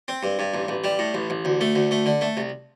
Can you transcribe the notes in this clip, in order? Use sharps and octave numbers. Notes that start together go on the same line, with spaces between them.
C4
G2
G2
A1
A1
G3
A2
A1
A1
D2
A3
D2
A3
D3
A3
C2